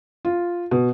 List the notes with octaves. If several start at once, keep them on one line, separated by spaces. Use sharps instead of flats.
F4
B2